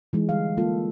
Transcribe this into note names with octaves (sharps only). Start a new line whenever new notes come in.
E3 G#3 D#4
D3 G3 F5
G#3 A#3 F4 A4